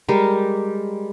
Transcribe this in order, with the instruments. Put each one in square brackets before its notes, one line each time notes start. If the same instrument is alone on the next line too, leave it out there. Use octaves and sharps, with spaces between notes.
[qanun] G3 G#3 G4 A#4